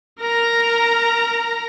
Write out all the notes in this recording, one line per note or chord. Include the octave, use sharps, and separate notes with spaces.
A#4 A#5